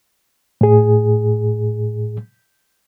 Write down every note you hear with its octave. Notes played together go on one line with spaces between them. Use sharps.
A2 G#4